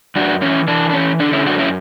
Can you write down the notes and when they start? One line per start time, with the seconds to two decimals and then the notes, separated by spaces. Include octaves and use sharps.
0.16 F#2 D4 F#4
0.41 E3 C#4 E4
0.68 E3 D4
0.90 D4
0.93 E3 C#4
1.20 D3 D4
1.33 C#4 E4
1.46 F#2 D4 F#4
1.58 C#4 E4